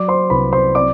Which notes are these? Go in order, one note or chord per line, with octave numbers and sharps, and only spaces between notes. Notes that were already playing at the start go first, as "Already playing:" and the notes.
Already playing: F#3 D5 D6
C5 C6
C2 B4 B5
C5 C6
C4 D5 D6